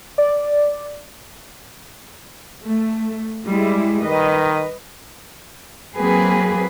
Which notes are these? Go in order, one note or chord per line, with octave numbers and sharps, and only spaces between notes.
D5
A3
G3 G#3 E4
D#3 B4 D#5
F#3 A#3 C4 G#4 B4